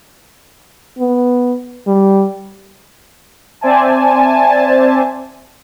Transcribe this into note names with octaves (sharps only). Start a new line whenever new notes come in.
B3
G3
C4 C5 D5 E5 G#5 A5